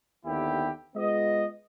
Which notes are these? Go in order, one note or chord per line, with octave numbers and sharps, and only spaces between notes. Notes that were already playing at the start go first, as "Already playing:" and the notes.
D#2 D3 B3 E4 G4 G5
G#3 B3 F4 D#5